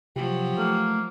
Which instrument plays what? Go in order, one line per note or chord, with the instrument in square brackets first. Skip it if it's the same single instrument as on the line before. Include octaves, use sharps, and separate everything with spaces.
[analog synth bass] C3 [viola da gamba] F3 F#3 [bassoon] G4
[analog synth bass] A3 [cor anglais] A#3